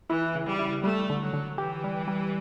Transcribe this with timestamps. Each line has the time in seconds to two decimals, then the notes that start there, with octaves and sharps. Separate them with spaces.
0.09 E3 E4
0.35 C#3
0.47 G3
0.59 E4
0.84 G3 A3
1.10 D3
1.22 F#3
1.33 D3
1.58 E3 G4
1.84 G3
2.08 G3